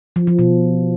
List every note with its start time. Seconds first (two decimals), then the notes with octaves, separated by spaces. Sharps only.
0.16 F3
0.27 F3
0.39 B2